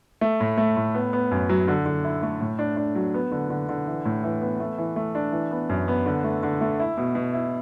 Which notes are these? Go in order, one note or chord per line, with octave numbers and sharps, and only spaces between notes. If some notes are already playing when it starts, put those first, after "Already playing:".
A3
A2
A3
A2
B3
B3
F#2
F#3
D3
D3
E4
A3
A2
D4
D4
F#3
B3
D3
D3
D3
E3
A2
E3
B3
A3
E3
A3
D4
E3
B3
F#2
B3
D3
A3
D3
A3
E4
B2
B2
E4